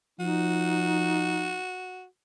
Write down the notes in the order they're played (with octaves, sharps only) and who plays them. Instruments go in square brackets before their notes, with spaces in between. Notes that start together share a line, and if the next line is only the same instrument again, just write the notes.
[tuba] F3 [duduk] D#4 [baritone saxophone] F#4